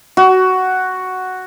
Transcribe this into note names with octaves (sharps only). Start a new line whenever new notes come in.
F#4